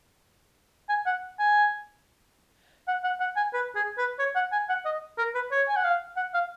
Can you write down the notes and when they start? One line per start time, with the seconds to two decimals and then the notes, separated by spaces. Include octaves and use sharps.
0.89 G#5
1.06 F#5
1.39 G#5
2.88 F#5
3.04 F#5
3.20 F#5
3.36 G#5
3.53 B4
3.75 G#4
3.98 B4
4.19 C#5
4.35 F#5
4.52 G#5
4.69 F#5
4.85 D#5
5.18 A#4
5.35 B4
5.51 C#5
5.68 G#5
5.76 F#5
5.84 F5
6.16 F#5
6.34 F5